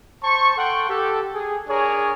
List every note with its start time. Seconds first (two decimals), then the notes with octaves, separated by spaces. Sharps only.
0.23 C5 A5 C#6
0.57 A4 F#5 G5 C6 C#6
0.90 G4 A4
1.35 G#4
1.68 D4 G#4 A#4 C#5